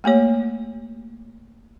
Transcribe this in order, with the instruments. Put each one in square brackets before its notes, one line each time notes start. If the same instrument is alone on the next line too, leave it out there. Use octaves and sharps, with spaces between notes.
[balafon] A3 A#3 G4 C#5